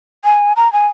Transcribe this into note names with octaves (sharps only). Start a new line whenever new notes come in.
G#5
A#5
G#5